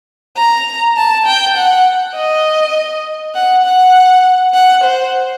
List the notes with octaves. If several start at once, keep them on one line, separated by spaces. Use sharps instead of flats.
A#5
A5
G5
F#5
D#5
F#5
F#5
F#5
C5